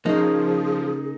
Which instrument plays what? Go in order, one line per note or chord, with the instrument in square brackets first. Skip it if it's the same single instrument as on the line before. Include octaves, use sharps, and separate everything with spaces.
[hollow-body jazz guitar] C#3 A#3 [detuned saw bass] F3 [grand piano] D#4 [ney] G#4